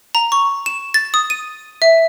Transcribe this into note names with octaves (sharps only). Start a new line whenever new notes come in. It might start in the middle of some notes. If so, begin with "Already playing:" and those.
A#5
C#6
E7
A6
D#6
D#7
E5